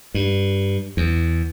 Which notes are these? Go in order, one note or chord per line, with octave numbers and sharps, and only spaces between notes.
G2
E2